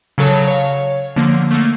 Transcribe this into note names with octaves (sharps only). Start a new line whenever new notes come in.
C#3 F#3 A4 C#5 A5
C#5 F5
D3 F3 A#3
A3 A#3